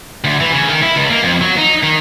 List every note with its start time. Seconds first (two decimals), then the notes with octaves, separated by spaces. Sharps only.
0.24 D2
0.40 E3
0.52 C#3
0.69 D#3
0.82 E4
0.96 C#2
1.10 A#3
1.23 F2
1.41 F#3
1.57 D#4
1.83 D#3